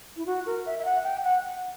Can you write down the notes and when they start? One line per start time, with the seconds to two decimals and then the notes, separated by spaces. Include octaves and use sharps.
0.17 E4
0.26 F#4
0.46 A#4
0.66 E5
0.79 E5
0.85 F#5
1.04 G5
1.24 F#5